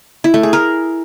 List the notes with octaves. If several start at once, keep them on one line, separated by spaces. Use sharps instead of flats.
E4
A3
G#4
A#4